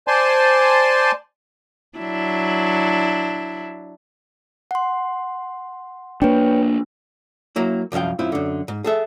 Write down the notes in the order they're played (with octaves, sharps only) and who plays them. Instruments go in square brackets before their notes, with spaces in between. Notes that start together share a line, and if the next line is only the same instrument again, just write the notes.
[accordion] C5 D5 G#5 A5 C6
[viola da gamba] F#3 D4 E4
[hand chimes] F#5 C6
[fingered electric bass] A#3 D4 [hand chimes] B4 C#5 G5
[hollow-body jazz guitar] F#3 A#3 E4
C2 F#2 F3 F5 G5
F#2 C4 E4 F4
F#2 D3
G#2
G#4 A4 E5